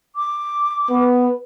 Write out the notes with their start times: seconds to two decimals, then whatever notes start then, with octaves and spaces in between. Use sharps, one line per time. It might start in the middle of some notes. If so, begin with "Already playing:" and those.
0.16 D6
0.90 B3 B4